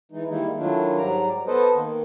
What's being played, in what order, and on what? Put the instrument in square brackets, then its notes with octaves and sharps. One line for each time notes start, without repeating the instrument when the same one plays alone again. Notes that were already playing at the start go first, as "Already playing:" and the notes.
[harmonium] E3 G#3 D#4
D#3 G3 G#3 A#3 D#4 E4
D#3 F#3 A3 D4 E4 F4
G#2 F#3 G3 D5 A#5
B3 A4 B4 C5 D#5
D#3 A#3